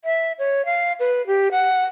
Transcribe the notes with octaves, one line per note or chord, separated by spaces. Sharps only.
E5
C#5
F5
B4
G4
F#5